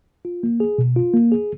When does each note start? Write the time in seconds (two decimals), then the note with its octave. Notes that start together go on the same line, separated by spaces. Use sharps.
0.25 F4
0.43 A#3
0.60 G#4
0.78 B2
0.96 F4
1.14 A#3
1.32 G#4